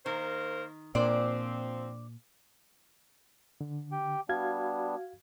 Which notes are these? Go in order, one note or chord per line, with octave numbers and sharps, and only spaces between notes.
D#3 A#3 A#4 C5
A#2 F3 C4 D4 C5 D5
D3
G4 G5
G3 B3 D4 F#4 F5 G#6